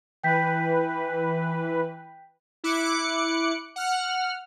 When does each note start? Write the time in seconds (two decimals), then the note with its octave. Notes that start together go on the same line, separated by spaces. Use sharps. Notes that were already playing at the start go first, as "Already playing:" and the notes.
0.24 E3 B4 G5 G6 B6
2.64 E4 D6 F#6 C#7
3.76 F#5 F6